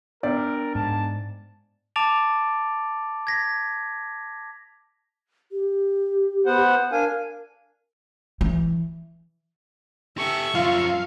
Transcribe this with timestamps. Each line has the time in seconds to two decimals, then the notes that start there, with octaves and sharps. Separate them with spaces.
0.23 B3 D4 A#4 D5 G5
0.75 G#2 A5
1.96 A5 D6 A6 D7 F7
3.27 G#6 A#6 B6
5.52 G4
6.46 B3 C5 F#5
6.92 D4 A#4 F5 G#5
8.41 E3
10.18 G4 A4 E5 C#6
10.55 F#2 F3 F4 F5